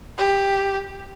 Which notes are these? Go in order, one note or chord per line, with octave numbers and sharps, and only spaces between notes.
G4